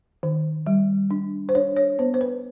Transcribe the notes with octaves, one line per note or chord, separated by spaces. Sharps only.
D#3
G3
D4
C5
D4 C#5
C#5
B3 C5
C5
B4